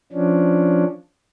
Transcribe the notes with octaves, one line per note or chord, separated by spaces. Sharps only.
F3 C#4 D4